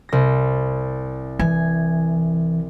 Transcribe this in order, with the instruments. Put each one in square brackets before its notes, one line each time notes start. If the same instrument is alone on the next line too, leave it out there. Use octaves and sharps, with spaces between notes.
[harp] C2 A#6
[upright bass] E3 [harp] G#5